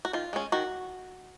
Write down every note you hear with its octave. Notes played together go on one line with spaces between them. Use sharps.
F#4
D#3 F4
G#3 C#4
D#3 F#4